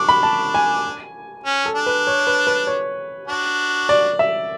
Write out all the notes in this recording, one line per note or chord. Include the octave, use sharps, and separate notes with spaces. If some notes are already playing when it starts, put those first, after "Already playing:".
Already playing: D4 C#6 D6
B5
A5
G#5
C#4
A4
D4
B4
C#5
B4
B4
C#5
D4 F#4
D5
E5